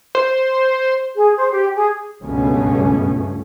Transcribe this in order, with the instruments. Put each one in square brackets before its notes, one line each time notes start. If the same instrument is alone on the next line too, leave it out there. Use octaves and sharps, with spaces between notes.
[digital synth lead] C5
[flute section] G#4
C5
G4
G#4
[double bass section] C#2 G2 B2 A3 C#4